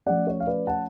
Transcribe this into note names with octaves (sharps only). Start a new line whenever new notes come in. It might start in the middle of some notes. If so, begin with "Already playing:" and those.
F3 A3 C#4 D5 F#5
C#5
F5
B4 D5
F#5 A5